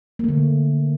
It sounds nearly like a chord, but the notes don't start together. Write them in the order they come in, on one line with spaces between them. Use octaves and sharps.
A#3 A3 D3